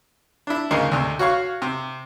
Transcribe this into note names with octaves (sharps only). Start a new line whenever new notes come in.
D4 E4
D2 G#2 C#3 G#3 A#3
D2 C3
F#4 C#5 F5 C#6
C3